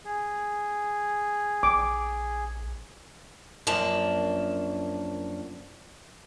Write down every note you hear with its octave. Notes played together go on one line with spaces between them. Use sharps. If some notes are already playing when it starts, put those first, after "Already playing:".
G#4
A#1 D6
F#2 F3 A#3 D4 A5